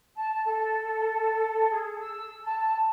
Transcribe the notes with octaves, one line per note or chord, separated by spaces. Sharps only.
A5
A4
G#4
E6
A5